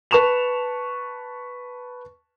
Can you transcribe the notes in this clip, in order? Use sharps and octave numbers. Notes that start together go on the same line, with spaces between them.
B4 A5 C#6 E7 F7